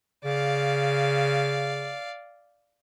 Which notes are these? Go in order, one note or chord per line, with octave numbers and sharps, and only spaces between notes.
C#3 D5 F5